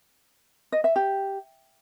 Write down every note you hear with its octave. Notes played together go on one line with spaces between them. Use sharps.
D#5
E5
G4